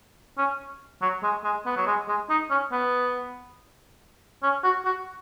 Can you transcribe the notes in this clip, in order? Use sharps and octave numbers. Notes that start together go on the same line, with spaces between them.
C#4
F#3
G#3
G#3
B3
F#3
G#3
G#3
D#4
C#4
B3
C#4
F#4
F#4